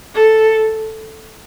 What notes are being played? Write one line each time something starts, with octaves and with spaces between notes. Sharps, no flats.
A4